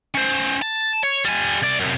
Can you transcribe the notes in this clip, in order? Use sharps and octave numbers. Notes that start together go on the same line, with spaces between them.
C#4 C5
A5
C#5
G3 G#5
C2 D5
F#2 C3